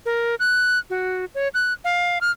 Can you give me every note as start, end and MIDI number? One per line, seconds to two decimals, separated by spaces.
0.06 0.35 70
0.40 0.79 90
0.90 1.25 66
1.35 1.48 73
1.54 1.73 90
1.85 2.19 77
2.21 2.31 89